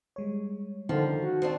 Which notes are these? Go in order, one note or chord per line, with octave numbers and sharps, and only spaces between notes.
G3 G#3 C#5
D3 D#3 F3
F#4
F3 C4 D4